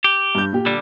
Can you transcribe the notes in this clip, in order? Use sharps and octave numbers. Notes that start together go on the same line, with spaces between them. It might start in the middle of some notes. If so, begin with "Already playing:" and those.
G4
G2 G6
A#2 G4
D3 G3